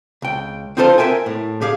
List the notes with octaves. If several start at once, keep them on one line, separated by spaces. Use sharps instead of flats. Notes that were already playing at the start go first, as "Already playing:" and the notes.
C#2 G5
C4 D#4 F4 A4 A#4 C5
A#4 B4 E5 G5 G#5
A2
G4 G#4 F5